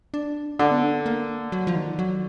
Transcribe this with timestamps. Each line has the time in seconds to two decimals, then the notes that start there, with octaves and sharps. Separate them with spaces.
0.14 D4
0.59 D3 D4
0.71 B3
0.83 D4
1.06 A#3
1.52 F#3
1.67 F3
1.75 D#3
1.99 F#3